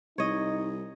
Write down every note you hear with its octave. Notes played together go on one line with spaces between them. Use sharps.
C2 D#4 C#5 D#5